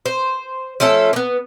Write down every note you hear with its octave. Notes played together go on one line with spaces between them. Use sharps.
C5
F3 A3 C#4 A4
A#3 B3